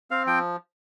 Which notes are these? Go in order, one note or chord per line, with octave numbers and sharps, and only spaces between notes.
C4 F5
F3 G5